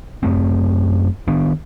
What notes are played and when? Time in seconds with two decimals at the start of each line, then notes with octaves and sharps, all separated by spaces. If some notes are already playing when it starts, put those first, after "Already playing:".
0.23 F#2 A3 C4
1.28 D#3 B3 D4